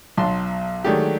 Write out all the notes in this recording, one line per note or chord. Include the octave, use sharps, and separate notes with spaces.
B1 F#3 A5 C6
D#3 F#3 G#3 A3 D4 G4